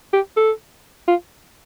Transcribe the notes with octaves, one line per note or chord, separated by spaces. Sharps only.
G4
A4
F4